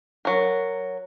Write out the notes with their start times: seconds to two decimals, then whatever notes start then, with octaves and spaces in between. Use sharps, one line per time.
0.25 F#3 A#4